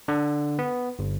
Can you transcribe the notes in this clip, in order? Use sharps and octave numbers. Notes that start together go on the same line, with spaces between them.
D3
B3
G1